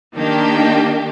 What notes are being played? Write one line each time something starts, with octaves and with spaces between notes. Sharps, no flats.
D#3 A#3 D4 G4